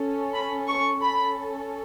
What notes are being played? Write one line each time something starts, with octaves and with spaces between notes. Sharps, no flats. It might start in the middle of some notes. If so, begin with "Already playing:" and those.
Already playing: C#4 A4
B5
C#6
C#4 A4 B5